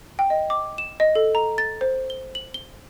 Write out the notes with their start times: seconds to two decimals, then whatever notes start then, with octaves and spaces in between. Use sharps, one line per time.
0.19 G5
0.30 D#5
0.50 D6
0.78 E7
1.00 D#5
1.15 A4
1.35 A#5
1.58 A6
1.81 C5
2.10 G7
2.35 F#7
2.54 G7